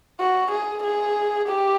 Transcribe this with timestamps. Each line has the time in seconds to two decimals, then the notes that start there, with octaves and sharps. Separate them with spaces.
0.19 F#4
0.52 G#4
0.84 G#4
1.48 G4